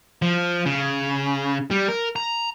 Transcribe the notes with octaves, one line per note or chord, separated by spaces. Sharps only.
F3
C#3
G3
A#4
A#5